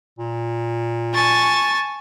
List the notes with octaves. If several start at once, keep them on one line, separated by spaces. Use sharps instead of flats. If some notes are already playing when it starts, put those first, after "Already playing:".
A#2
G#5 A5 C#6 A6